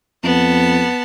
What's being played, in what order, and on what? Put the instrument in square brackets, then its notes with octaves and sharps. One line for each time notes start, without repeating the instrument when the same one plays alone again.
[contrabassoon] F2 [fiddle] B3 A5